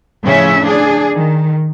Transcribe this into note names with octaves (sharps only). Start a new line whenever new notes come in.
A2 C#3 F3 C#4 E5
D4 G#4
D#3